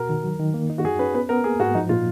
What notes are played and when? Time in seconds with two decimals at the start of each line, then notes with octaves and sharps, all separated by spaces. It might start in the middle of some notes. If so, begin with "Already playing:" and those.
Already playing: B2 F#4 A#4
0.09 D#3
0.23 F#3
0.40 D#3
0.54 A#3
0.70 D#4
0.78 F#4
0.84 F#2 G#4
0.99 C#4 B4
1.14 B3 B4
1.29 B3 A#4
1.44 A#3 G#4
1.60 G#2 F#4
1.75 F3 D#4
1.89 A#2 F4